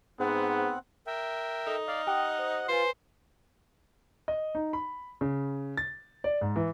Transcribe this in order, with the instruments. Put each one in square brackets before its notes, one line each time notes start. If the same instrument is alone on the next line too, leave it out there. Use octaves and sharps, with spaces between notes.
[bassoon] G#2 [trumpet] B3 [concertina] C4 F#5
[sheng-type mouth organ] A#4 E5 G5
[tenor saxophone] D#4 [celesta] A4
[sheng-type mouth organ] D5 F5 [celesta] F6
[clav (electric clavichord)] G4 [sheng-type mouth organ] D#5 F#5
[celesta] C5
[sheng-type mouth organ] F4 [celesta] B4 G#5 [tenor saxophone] C5
[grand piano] D#5
D#4
B5
C#3
A6
D5
G#2
E3